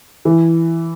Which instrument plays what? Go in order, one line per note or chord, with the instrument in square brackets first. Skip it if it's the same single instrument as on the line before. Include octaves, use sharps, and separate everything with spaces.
[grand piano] E3